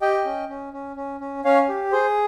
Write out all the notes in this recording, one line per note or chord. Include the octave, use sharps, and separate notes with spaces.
G4 D#5 G5
C#4
C#4
C#4
C#4
C#4
C#4 C#5 F5
G4
G#4 C5